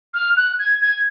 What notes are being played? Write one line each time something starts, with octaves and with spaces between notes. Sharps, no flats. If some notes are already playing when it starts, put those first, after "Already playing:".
F6
F#6
G#6
G#6